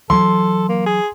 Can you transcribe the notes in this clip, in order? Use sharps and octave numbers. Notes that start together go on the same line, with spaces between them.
E3 F#3 A4 C6
A#3
G#4